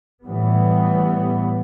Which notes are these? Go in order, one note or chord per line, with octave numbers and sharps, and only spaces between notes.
A2 E3 G3 B3